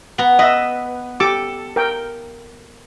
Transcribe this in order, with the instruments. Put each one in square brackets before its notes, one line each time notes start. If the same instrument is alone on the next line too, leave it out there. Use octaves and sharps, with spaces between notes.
[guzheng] B3 A#5
[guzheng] B4 [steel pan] D#5 E5
[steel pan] G4 D6 [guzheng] A4
[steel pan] A#4 G5